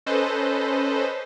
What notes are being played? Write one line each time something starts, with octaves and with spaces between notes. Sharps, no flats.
C#4 A4 B4 C5 D#5